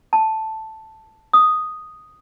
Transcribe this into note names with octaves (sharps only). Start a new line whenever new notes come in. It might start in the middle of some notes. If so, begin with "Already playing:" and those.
A5
D#6